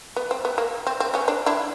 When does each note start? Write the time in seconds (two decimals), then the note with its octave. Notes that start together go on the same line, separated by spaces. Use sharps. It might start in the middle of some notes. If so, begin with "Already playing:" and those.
0.16 B3
0.31 C4
0.45 B3
0.58 A#3
0.87 C4
1.00 C4
1.14 B3 C#4
1.28 C4 D4
1.46 D4 E4